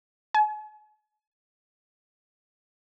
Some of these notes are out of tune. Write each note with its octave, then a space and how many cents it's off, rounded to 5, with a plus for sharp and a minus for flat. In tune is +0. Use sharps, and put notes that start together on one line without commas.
G#5 +45